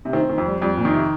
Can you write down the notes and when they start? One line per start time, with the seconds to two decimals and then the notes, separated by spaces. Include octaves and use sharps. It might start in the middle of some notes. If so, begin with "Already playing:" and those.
0.05 C3
0.13 D#3 C4
0.29 D#3
0.38 F2
0.46 G3
0.61 F2 G3
0.77 A#2
0.85 D#3
0.93 C3